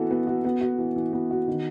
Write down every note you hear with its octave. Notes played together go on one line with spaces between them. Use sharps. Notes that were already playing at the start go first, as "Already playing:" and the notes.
Already playing: E3 B3 F#4 A4
B3
F#4
B3
F#4
E3
E3
B3
F#4
D#3